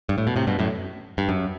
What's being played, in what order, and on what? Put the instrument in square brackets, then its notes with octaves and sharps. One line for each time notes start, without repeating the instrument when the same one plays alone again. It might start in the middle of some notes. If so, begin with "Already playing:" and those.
[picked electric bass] G2
A2
B2
A2 C3
G2 B2
F#2 A2
G2
F#2